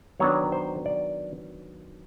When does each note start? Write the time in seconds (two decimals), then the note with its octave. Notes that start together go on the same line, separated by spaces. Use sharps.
0.20 D#3 F#3 B3 D4 C#5
0.52 C5
0.86 D5